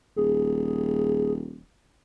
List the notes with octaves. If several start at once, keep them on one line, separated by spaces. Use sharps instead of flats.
D#1 G#4